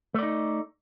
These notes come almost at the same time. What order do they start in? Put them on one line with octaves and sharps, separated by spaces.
A3 D5 D#4